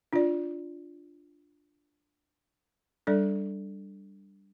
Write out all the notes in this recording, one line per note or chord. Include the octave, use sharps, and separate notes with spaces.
D4 F4 D5
G3 D4 A4 D5